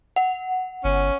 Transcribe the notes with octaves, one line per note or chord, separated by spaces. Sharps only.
F#5
G1 C#4